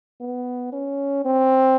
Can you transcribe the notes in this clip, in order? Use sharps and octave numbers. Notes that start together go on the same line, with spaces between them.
B3
C#4
C4